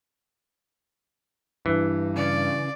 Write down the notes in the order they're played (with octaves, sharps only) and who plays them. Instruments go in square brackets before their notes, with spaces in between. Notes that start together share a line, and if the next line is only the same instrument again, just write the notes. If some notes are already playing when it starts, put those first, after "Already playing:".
[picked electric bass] G2 [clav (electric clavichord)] E3
[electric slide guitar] C#3 [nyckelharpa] D5